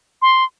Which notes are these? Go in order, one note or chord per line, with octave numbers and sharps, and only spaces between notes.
C6